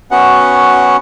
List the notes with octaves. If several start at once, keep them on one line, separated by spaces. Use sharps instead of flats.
B3 C#4 F#4 F#5